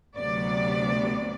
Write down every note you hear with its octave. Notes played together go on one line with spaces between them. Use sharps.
D2 C3 F#3 B3 D5